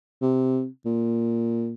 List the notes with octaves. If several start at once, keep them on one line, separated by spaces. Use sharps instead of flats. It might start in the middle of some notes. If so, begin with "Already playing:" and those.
C3
A#2